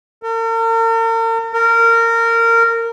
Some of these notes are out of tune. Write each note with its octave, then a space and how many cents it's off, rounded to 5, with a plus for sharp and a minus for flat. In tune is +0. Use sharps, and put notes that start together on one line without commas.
A#4 -45
A#4 -20